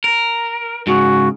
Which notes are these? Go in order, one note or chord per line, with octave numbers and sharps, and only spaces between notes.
A#4
G#2 C#3 F#4